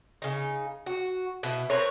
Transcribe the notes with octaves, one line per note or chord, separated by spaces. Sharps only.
C#3 D#4
F#4
B2 E4
C4 A#4 B4 C#5